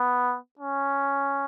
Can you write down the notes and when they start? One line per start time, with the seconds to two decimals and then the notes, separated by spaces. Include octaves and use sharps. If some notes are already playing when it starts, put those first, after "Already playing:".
Already playing: B3
0.59 C#4